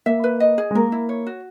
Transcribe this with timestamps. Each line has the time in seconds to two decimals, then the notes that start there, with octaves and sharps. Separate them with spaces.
0.06 A#3 E5
0.24 B4
0.40 D#5
0.58 G#4
0.71 G#3
0.75 A#3 A#4
0.92 E4
1.09 C#5
1.27 F#4